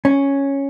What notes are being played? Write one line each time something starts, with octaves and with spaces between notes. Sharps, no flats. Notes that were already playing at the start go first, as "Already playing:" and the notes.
C#4